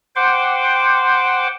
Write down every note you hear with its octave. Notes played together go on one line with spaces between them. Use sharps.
C5 F#5 G5 C6 D6